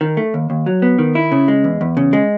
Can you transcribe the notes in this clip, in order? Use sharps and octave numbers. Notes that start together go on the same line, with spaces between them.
D#3
A3
D#2
D#2
F#3
B3
D#3
E4
C#3
G#3
E2
E2
C#3
G#3